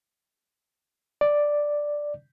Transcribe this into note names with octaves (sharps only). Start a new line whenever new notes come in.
D5